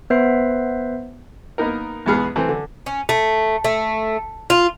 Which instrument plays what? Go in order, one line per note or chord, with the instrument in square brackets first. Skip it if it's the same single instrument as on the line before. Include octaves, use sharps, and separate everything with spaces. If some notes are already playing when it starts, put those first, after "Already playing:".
[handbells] B3 B4 C5 E5 C7
[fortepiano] A#3 B3 D#4 A#4
E2 G#2 B3 G#4 F6
E3 A3 C4
D3
[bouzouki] C#4
A3
A3
F4